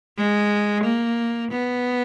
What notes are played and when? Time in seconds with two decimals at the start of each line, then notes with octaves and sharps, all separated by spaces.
0.17 G#3
0.84 A#3
1.51 B3